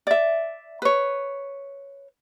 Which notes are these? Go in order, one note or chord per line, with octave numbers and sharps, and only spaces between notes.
D5 E5
B4 C#5